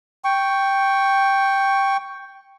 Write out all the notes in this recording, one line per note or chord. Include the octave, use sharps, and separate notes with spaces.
G5 C#6